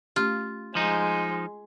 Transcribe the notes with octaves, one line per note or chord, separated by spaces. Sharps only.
A3 C#4 F4 G4
F3 G#3 D#4